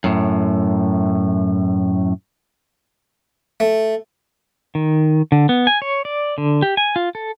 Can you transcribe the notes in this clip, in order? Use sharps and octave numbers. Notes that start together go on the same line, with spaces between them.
F#2 A2
A3
D#3
D3
B3
G#5
C#5
D5
D3
G4
G#5
F4
A4